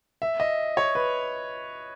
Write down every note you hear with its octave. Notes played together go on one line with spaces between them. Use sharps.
E5
D#5
C#5
B4